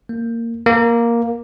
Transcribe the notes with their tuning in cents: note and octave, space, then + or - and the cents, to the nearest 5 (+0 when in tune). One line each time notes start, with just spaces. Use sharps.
A#3 -15
A#3 +5